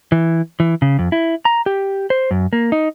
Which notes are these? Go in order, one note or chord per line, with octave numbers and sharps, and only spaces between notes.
E3
E3
C#3
F2
E4
A#5
G4
C5
F#2
A#3
D#4